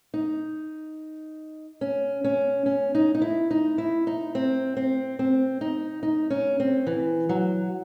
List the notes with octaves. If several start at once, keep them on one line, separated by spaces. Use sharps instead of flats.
D#4
C#4
C#4
C#4
D#4
D#4
E4
D#4
E4
D#4
C4
C4
C4
D#4
D#4
C#4
C4
E3
F#3